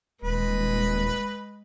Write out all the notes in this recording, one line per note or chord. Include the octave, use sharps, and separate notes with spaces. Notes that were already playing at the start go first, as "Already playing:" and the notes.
D#1 G#3 B4